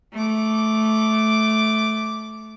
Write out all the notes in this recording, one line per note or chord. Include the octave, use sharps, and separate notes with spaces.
A3 D6